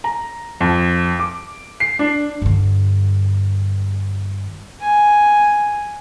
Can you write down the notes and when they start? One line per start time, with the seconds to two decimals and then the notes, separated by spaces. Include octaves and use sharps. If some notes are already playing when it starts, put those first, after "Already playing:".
0.04 A#5
0.61 F2
1.19 D6
1.80 C7
1.99 D4
2.42 G2 D3
4.81 G#5